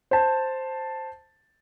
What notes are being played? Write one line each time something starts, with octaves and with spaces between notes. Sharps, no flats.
C5 A5